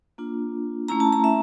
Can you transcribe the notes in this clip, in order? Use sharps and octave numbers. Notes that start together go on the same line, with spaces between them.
A#3 D4 F4
A3 C#4 E4 A#5
A5
A#5
E5